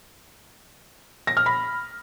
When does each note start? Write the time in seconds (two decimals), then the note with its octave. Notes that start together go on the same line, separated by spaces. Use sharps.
1.27 A#6
1.37 F6
1.46 B5